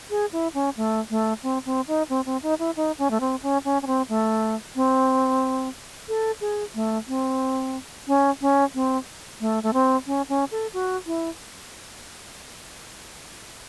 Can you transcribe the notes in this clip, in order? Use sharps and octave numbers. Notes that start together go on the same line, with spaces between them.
G#4
E4
C#4
A3
A3
C4
C4
D#4
C4
C4
D#4
E4
D#4
C#4
A3
C4
C#4
C#4
C#4
C4
A3
C4
A4
G#4
A3
C4
C#4
C#4
C4
A3
A3
C4
C#4
C#4
A4
F#4
E4